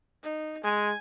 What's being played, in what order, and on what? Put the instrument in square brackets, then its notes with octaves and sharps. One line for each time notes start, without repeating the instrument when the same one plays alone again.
[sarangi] D#4
[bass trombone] G#3 [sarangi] G#5